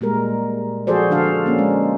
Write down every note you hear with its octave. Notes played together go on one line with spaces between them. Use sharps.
A#2 G3 G#3 A#4
F3 F#4 G#4 A4 C5 D5
D3 F3 D4 F#4 A4 F5
A#3 C#4
G#3